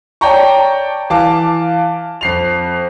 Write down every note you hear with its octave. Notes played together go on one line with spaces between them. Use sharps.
C#5 D5 G5 A5 A#5 C#6
E3 F5 A5 D6
F2 C7 F7